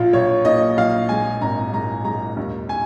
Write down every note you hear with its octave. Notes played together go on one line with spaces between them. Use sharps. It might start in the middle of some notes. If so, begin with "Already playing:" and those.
Already playing: A#1 F4
A#1 C#5
A#2 D#5
A#1 F5
G#3 G#5
G#1 A#5
G#3 A#5
G#3 A#5
D#2
G#5